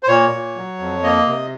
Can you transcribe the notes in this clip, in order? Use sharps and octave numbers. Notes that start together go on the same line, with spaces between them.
C5
A#2 C#5
A#2
F#3
F2
A#3 D#5
C3